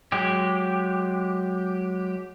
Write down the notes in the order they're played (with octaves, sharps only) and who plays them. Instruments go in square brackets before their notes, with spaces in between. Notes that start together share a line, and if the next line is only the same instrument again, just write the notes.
[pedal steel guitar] F#3 G#3 G4